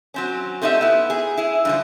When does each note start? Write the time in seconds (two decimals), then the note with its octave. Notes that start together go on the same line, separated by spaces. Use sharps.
0.14 F#3 C4 C#4
0.62 A3 C4 D#4 G4 E5
0.81 B3 E4
1.10 G#4
1.37 E4 G#4
1.65 G2 D3 F3